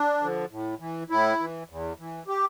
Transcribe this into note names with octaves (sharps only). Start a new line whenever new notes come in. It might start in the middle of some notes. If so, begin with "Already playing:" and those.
Already playing: D4
D3 F3
A2
E3
A2 E4
E3
E2
E3
G4